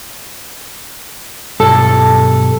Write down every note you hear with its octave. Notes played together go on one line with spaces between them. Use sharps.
B1 G2 A4 A5